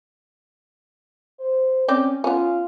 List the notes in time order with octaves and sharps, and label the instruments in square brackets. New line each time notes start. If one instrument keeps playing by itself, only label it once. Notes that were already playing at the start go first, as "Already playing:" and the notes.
[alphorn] C5
[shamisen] C4 D5 G5 [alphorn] C#4
[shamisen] B3 C#4 [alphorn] F4